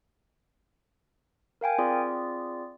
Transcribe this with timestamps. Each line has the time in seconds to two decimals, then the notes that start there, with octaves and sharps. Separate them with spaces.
1.61 A#4 F5 G5 G#5
1.78 C4 F4 G#4 D5